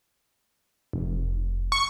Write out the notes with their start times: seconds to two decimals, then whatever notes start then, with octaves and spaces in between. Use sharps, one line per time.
0.93 F1
1.72 C#6